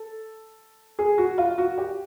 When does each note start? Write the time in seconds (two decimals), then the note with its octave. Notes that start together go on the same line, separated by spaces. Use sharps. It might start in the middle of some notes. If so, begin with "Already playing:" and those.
Already playing: A4
0.99 G#4
1.18 F#4
1.38 F4
1.58 F#4
1.78 G4